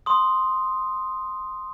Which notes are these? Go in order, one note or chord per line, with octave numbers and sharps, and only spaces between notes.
C6 D#6